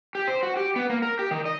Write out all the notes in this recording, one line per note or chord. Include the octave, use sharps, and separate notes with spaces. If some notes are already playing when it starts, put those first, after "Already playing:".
G4
C5
F#4
G4
B3
A#3
A#4
G4
D#3
D#5